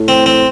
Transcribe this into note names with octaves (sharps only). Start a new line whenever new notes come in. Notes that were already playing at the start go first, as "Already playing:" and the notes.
Already playing: A2
C4
C4